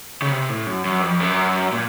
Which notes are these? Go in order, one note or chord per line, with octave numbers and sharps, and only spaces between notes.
C#3
C3
A2
F#2
F#2
F2
F#2
A#2